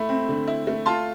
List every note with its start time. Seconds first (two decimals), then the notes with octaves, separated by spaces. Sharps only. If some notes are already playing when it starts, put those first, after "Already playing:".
Already playing: A3 E4 B5
0.09 C4
0.29 D3
0.47 E4
0.67 A3
0.86 F4 A5 C6